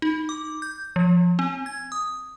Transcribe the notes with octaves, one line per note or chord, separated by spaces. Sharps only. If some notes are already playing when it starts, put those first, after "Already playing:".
D#4
D6
G6
F3
C4
G#6
D#6